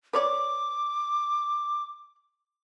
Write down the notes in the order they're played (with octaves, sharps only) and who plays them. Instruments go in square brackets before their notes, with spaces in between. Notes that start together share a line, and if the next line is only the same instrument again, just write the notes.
[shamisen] B4 C#5 D5 [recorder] D6